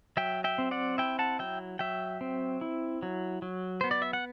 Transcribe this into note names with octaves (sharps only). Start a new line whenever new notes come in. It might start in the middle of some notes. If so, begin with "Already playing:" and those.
F#3 E5 G5
E5 G5
C4
D5 F#5
E4 E5 G5
F#5 A5
F#3 E5 G5
F#3 E5 G5
C4
E4
F#3
F#3
B3 C5
D5
E5
F#5